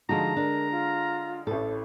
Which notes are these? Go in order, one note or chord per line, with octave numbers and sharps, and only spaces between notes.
D3 F3 G#3 D#4 F#4 A5 A#5
D4 A#4
F4
A1 A2 A4